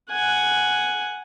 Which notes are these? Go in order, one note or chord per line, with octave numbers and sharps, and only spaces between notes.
F#5 G#5